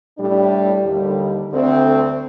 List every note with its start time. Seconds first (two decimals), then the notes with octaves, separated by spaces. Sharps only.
0.18 A2 G3 D4
0.85 D#2 D3 G3
1.51 D2 D3 A3 C4